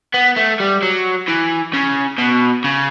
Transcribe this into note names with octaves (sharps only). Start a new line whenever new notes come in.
B3
A3
G3
F#3
E3
C#3
B2
C#3